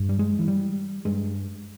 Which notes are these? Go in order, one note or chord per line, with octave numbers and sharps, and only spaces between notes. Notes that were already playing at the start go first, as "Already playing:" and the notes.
Already playing: G2
G3
G#3
E3
G3
G2 G#3